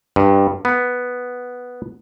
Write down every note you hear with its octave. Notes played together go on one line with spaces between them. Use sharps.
G2
B3